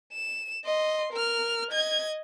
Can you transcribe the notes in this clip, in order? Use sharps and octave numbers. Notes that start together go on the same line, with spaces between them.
E7
D#5 C6
A#4 F6
D#5 G#6